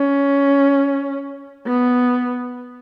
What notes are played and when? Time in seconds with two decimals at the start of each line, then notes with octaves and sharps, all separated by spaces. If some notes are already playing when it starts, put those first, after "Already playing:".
Already playing: C#4
1.67 B3